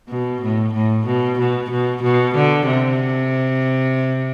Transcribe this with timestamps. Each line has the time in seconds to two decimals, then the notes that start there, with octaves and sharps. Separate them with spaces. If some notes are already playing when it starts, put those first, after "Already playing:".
0.09 B2
0.42 A2
0.74 A2
1.06 B2
1.39 B2
1.71 B2
2.03 B2
2.35 D3
2.67 C3